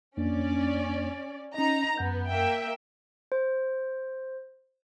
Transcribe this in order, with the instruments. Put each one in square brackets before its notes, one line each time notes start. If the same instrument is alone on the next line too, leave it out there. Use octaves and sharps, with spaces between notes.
[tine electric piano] F2 A#3 D4 [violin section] C#4 D5
[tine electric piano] C#4 D#5 [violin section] D#4 A#5
[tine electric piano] F#2 F#5 G6 [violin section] B3
[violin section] A#3 E5 G5
[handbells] C5